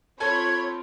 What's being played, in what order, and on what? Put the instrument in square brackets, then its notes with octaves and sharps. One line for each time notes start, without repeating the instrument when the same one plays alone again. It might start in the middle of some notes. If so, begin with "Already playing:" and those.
[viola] C4 F4 [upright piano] A4 [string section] C#5 B5 [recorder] G#6